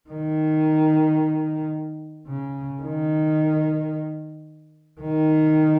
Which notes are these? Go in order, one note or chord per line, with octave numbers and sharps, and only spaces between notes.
D#3
C#3
D#3
D#3